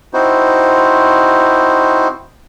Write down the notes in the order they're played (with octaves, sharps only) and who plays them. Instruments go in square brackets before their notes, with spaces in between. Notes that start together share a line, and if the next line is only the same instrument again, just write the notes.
[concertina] C4 D#4 E4 F#4 C5